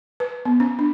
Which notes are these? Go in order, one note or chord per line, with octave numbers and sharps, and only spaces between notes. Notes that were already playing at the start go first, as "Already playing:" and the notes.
B4
B3
C#4
D4